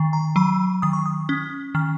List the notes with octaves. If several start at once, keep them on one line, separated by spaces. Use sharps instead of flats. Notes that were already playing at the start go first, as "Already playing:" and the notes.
Already playing: D#3
A#5
F#3 B5
D#3 D#6
C#6
D#6
C#4
D#3 F6